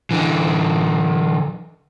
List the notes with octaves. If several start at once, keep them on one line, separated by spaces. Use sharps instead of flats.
D3 E3